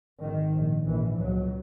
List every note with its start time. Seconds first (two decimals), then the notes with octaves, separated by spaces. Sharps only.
0.22 G#1 G#2 D#3
0.54 A#1 A#2
0.87 A#1 G#2 E3
1.19 C#2 B2 F#3